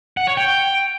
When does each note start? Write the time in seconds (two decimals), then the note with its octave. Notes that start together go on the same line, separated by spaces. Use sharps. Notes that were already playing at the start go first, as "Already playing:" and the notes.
0.17 F#5
0.27 C#5
0.37 G5